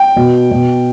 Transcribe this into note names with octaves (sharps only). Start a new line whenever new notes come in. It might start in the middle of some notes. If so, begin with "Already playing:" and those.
Already playing: G5
B2
B2